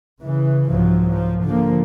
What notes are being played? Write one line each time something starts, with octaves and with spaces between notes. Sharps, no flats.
C#3 E3
C2 G#2 F3 F#3
F3
D3 F3 A#3